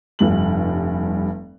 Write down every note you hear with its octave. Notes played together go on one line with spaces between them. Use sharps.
F1 G2 F#7